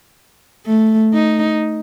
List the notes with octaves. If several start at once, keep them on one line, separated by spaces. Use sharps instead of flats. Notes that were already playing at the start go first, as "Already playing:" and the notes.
A3
D#4